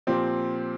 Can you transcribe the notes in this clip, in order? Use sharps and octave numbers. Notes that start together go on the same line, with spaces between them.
A#2 F3 C4 G4